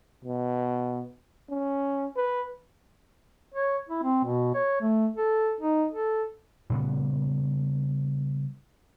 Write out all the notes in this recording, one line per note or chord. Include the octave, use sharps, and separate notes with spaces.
B2
C#4
B4
C#5
E4
C4
B2
C#5
A3
A4
D#4
A4
A#2 C#3 G3 B3